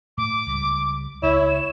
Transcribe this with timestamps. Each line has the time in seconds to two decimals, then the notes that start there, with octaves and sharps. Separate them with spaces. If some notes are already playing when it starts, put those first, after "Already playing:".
0.18 A2 D6
0.46 C#2 G3
1.23 C#2 E4 C#5 E7